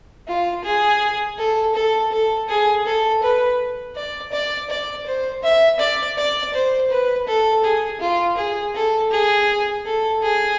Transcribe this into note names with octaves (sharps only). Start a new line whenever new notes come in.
F4
G#4
A4
A4
A4
G#4
A4
B4
D5
D5
D5
C5
E5
D5
D5
C5
B4
A4
G#4
F4
G#4
A4
G#4
A4
G#4